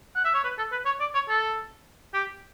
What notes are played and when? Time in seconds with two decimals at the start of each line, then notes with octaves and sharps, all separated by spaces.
0.15 F#5
0.25 E5
0.34 C#5
0.44 B4
0.58 A4
0.72 B4
0.85 C#5
1.00 D5
1.14 C#5
1.29 A4
2.14 G4